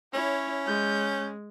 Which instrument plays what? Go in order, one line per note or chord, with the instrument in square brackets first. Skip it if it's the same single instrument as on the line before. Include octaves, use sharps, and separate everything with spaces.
[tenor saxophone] C#4 [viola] E4 [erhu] C#5
[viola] G#3 [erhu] G6